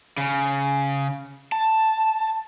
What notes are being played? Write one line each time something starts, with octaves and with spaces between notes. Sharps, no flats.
C#3
A5